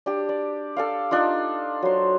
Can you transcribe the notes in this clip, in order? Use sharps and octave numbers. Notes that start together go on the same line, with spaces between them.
D4 G4
D5
A4 D5 F5
D4 D#4 F4
F#3 C5